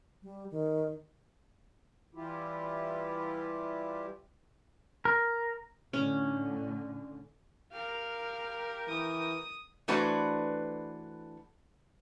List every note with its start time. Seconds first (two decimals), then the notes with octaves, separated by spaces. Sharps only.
0.23 G3
0.51 D#3
2.15 E3 G3 E4 F4 G4
5.05 A#4
5.93 A2 D3 C#4
7.72 G4 A#4 F5
8.88 E3 D#6
9.88 E3 A3 D4 F#4 B4 C5